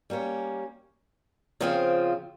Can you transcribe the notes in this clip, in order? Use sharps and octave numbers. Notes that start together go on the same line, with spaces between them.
G3 A#3 C#4
C#3 F3 C4 F4